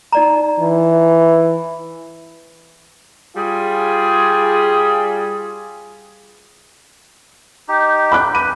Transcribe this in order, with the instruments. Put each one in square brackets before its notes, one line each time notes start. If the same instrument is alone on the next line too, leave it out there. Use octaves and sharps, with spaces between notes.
[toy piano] D#4 D5 A#5
[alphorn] E3
[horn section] G3 F4 G#4
[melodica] D#4 G4
[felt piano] B5 D6 F#6
[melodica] B4 [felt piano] D#7